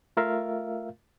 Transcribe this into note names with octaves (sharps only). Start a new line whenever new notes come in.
A3 F4 A#4 E5 F5